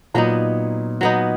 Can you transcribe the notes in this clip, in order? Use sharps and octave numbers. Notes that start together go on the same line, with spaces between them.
A#2 F#3 B3 D#4
F#3 B3 D#4